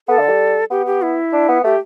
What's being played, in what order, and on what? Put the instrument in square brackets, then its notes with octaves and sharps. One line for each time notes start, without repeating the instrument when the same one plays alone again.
[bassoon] B3 [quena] A4
[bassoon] D3
G3
[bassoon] B3 [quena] G4
[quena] G4
E4
[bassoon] D4
B3
[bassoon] A3 [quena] G4